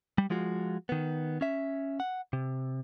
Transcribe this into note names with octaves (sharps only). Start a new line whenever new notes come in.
G3
F3 G#3 F4 F#4
D#3 B3
C#4 E5
F#5
C3